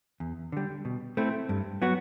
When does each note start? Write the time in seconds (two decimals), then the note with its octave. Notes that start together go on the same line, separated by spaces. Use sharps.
0.20 E2
0.52 D3 G3
0.85 B2
1.17 A3 C4 E4
1.49 G2
1.82 F#3 B3 F#4